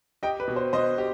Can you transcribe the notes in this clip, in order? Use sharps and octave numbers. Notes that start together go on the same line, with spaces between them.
G4 D#5 G5
B4
B2
C5
B2 C5 D#5
G4